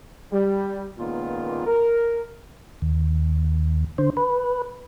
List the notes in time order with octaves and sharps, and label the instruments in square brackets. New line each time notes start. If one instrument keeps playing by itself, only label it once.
[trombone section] G3
C#2 A#2 D#3 A#3 B3 F4
A#4
[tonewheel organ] D#2
D3 C5
B4